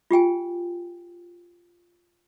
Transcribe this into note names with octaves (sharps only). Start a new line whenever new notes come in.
F4 G4 G5 G#5